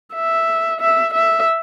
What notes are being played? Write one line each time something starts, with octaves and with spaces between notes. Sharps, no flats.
E5
E5
E5